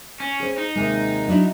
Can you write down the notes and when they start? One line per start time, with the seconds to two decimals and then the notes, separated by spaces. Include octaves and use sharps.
0.20 C#4
0.40 G#4 C5
0.57 D#4
0.75 D#2 C3 G#3
1.28 F#3 D4 E4